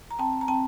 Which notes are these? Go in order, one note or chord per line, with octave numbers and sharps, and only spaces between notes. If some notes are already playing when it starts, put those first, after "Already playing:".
A#5
C4 G5 A5
A#5
C4 G5 A5